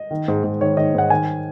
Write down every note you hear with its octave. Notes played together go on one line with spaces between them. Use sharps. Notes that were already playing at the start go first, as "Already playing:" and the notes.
Already playing: D#5
D#3
G#2
G#2
D#3 C#5
D#3 D#5
G#2 F#5
D#3 G#5